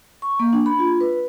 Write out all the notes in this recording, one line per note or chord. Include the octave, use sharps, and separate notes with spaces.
C#6
A#3
D4
B5
F4
B4